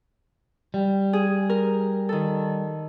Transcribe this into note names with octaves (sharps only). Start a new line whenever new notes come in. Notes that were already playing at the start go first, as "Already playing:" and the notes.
G3
G#4
A#4
D#3 A4